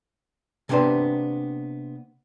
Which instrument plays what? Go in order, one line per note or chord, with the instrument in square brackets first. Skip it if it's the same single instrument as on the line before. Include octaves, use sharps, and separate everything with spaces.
[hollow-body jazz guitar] C3 A#3 B3 D4 G4 C5